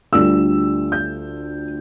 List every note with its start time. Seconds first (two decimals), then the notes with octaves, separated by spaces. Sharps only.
0.12 D2 D3 G3 D4 F4 E6
0.92 G6